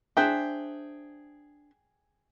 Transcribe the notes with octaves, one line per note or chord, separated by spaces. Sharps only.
D4 G#4 C5 E5 G5